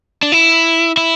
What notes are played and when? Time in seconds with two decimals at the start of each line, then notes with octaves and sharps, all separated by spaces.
0.23 D4
0.32 E4
0.97 E4